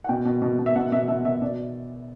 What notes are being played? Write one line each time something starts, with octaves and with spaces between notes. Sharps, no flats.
F#5
B2 G5
B2
B2
B2
E5
B2 F#5
B2 E5
B2 E5
B2 E5
B2 D5